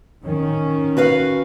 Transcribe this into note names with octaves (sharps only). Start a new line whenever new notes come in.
D#3 C#4
F#4 B4 F5